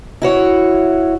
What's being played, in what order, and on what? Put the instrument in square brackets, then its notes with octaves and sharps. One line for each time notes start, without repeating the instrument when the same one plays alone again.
[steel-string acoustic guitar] E4 F#4 C#5